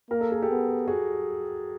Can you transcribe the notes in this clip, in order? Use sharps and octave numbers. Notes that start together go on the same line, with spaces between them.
A#3 A#4
A4
G#4
G4 A4
B3
F#4 G#4